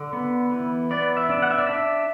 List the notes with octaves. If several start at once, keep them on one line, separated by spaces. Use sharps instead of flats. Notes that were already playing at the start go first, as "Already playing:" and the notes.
Already playing: D3
B3
E3
B3 D5
E5
D4
F#5
E5
D5
D4 E5